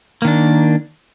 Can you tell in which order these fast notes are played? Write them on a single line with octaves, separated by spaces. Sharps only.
A#3 D#3 D4